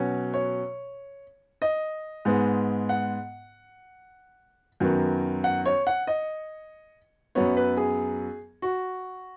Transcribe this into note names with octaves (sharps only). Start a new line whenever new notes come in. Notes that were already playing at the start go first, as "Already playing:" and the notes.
Already playing: B2 F#3 C#4
C#5
D#5
G#2 G#3 B3
F#5
F#2 D#3 F#3 B3
F#5
C#5
F#5
D#5
F#2 F#3 B3 C#5
B4
G#4
F#4